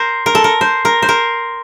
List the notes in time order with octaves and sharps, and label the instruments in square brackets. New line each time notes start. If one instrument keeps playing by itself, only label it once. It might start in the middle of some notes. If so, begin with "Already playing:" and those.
Already playing: [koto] A#4 C5
A#4
A4
A#4
C5
A#4
C5
A#4